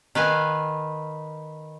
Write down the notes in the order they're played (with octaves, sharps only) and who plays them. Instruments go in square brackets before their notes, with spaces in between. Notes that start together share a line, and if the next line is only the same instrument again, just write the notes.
[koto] D#3 B4 F5 G#5